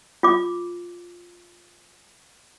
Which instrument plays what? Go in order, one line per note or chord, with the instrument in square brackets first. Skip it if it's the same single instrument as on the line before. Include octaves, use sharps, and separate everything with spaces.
[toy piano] F4 D6